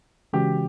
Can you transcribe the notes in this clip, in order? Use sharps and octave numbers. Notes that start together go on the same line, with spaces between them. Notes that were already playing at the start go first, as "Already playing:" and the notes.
C#3 E3 G#3 C#4 F#4 G4